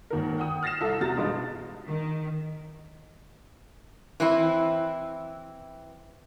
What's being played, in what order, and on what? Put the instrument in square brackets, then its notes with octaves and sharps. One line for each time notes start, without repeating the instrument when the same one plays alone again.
[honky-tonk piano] G#1 D#2 A#4
F#5 G5 D#6
F6 A6 A#6 C7 E7
C2 A4 E5
E2 C3 F#4 A#5 A6
G2 B2 G#3 B3 D#4 F4
[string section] D#3
[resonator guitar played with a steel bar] E3 C4 E4